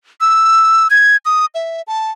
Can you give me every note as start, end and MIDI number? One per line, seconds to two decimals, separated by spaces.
0.21 0.88 88
0.90 1.17 92
1.25 1.46 87
1.55 1.82 76
1.87 2.11 81